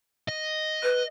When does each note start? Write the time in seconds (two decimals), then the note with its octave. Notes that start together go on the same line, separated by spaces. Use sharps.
0.29 D#5
0.83 B4